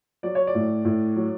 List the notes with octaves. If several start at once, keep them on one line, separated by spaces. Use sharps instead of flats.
F#3 D5
C#5
D5
A2
A2
F#3